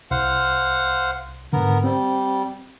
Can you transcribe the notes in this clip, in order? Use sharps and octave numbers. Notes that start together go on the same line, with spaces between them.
C2 C5 F5 F#5
G#2 D3 B3 A#4
G3 C4